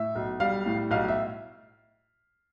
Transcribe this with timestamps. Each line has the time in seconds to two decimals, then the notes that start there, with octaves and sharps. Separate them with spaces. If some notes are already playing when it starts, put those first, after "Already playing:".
Already playing: A2 E5
0.15 B1
0.40 G3 F5
0.66 A2
0.91 B1 F5
1.08 E5